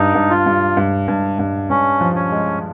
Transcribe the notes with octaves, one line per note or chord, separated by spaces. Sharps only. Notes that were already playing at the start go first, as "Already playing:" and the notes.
Already playing: G2 D#4
G2
F4
G2
G2
G2
G2
G2 C#4
F3
C#4
G#3